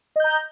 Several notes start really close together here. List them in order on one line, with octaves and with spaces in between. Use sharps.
D#5 G6 A#5